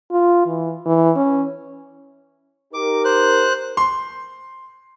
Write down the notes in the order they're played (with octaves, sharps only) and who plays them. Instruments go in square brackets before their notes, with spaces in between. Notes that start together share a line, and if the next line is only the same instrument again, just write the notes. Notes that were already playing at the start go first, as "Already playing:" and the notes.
[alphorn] F4
E3
E3
C#4
[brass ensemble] D#4 G4 A#4 [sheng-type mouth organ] D6
[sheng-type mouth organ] C5 F#6
[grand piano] C6